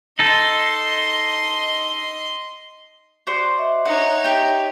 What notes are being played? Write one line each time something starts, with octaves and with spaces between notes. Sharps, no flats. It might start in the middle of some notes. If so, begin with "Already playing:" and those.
D#4 A4 D#5 C6
F#4 C5 D5
D#5 E5
D#4 C#5 F#5
G4 G5